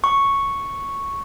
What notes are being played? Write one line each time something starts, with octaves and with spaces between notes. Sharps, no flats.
C#6